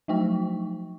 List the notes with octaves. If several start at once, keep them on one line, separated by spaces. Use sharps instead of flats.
F3 F#3 A3 D#4 G5 C#6